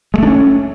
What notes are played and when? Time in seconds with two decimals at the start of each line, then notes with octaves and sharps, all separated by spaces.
0.14 G#3
0.18 A3
0.23 D4
0.27 C#4